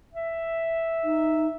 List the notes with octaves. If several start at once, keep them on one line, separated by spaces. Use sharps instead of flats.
E5
D#4